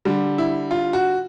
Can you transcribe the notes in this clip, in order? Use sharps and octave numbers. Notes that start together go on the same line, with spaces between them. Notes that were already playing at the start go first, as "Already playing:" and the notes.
D3 G3
E4
F4
F#4